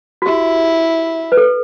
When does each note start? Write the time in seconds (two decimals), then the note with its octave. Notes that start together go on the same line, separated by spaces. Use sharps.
0.22 F#4
0.26 E4 G4
1.32 B4
1.37 A4